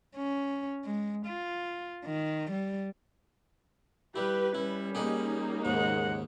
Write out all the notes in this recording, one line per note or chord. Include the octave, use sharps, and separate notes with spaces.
C#4
G#3
F4
D#3
G3
G3 E4 G4 B4
G3 C#4 E4
A#3 D#4 G4 G#4 F#5
D#2 G#2 C#3 G#3 F#5